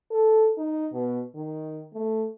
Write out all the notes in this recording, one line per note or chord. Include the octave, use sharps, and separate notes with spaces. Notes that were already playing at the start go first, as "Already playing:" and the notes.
A4
D#4
B2
D#3
A3